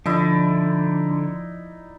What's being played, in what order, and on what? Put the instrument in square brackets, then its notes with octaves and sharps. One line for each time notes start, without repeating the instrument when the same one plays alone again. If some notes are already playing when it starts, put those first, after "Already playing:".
[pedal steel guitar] D3 [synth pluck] F3 [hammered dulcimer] D#4 E4 D5